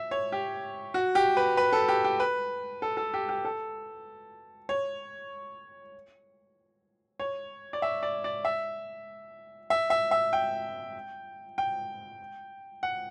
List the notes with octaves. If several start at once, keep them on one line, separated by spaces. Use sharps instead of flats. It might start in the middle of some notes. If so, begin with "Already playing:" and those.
Already playing: E5
C#5
G4
F#4
G4
B4
B4
A4
G4
G4
B4
A4
A4
G4
G4
A4
C#5
C#5
D5
E5
D5
D5
E5
E5
E5
E5
G5
G5
F#5